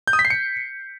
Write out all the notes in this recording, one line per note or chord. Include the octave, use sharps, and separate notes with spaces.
G6
D#6
B6
C7
C#7